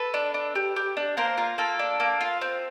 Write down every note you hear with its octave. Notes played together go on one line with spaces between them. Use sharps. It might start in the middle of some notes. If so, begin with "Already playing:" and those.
Already playing: A4 B4
D4
D4
G4
G4
D4
A#3 A#4 C5
F4 A#4
A#3 A4
D4
A#3
F4
C4